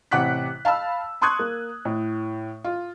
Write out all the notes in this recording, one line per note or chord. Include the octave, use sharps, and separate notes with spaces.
A1 C3 F#5 D6 F#6 B6
F5 A5 B5 E6
A5 C6 C#6 D#6 F#6 G#6
A#3
A2
F4